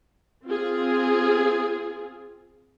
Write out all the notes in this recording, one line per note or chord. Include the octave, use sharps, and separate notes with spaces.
C4 F4 G#4